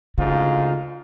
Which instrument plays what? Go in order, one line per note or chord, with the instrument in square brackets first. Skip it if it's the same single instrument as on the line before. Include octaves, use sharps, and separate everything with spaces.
[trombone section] D2 G#2 F4 [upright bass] C#3